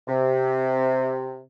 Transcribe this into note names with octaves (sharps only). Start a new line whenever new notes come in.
C3